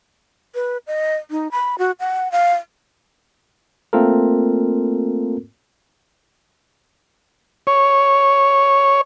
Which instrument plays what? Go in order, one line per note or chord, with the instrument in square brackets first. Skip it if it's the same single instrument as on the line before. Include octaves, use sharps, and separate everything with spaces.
[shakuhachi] B4
D#5
D#4
B5
F#4
F#5
F5
[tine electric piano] A3 A#3 C4 F4 A4 A#4
[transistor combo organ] C#5